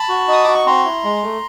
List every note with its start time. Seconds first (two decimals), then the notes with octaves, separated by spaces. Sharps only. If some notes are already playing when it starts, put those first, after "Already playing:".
Already playing: A5 B5
0.09 F#4
0.28 D#4 D#6
0.44 F#4 D6
0.55 C#6
0.66 C4 A#5 C6
0.85 E4
1.04 G#3
1.23 A3